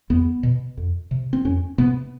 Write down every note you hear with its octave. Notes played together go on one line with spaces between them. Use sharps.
E2 B3
B2
F2
C3
C4
F2 C#4
C3 B3